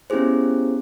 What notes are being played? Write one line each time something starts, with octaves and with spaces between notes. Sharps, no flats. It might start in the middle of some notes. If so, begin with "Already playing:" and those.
B3 C#4 E4 G4 G#4 C5